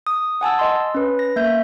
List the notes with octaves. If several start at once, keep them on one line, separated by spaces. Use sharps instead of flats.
D#6
F#5 G#5 A5 E6
D#5 C6
C#4 B4
A#6
A#3 E5 G6